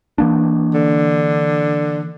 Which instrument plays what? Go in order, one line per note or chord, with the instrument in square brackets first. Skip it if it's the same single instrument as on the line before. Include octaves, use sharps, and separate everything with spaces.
[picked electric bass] E3 A#3 D4
[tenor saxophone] D3